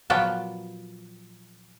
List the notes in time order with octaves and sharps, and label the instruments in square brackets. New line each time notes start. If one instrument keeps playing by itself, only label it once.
[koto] A#2 F3 F#3 B3 G5 A5